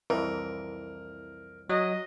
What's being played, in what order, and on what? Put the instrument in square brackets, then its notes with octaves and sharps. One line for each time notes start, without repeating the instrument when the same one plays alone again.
[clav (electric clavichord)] C2 F2 E3 [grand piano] A#4
[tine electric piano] F#3 [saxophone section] D#5